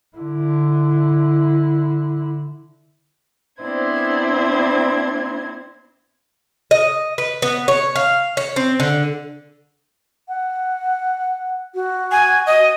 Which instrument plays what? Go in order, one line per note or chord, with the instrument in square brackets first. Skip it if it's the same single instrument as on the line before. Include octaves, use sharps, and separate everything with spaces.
[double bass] D3 E4
[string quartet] B3 C4 D4 E4 C5 G#6
[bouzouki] D#5
B4
B3
C#5
F5
C#5
C4
D3
[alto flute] F#5
F#4
[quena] G#5
D#5